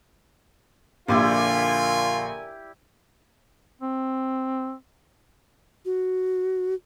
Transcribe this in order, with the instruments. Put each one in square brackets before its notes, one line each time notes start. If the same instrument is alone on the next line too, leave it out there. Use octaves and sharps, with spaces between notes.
[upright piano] A#1 [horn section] D3 A#4 G#5 [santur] E4 G4 D5 [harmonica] F4
[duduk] C4
[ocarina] F#4